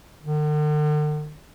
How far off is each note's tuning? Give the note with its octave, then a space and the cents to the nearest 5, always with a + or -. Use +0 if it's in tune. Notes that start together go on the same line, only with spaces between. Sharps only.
D3 +45